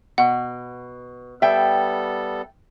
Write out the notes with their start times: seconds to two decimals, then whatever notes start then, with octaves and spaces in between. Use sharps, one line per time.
0.18 B2 F#5
1.42 G3 B3 A4 E5 G5